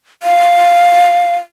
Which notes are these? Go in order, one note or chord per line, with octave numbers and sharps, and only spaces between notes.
F5